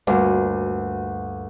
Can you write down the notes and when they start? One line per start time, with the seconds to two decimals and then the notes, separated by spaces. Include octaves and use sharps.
0.07 D2 G2 A#2